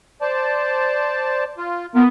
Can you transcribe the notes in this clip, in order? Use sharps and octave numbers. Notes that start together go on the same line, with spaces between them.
C5 D5 A5
F4
B3 F4 A#4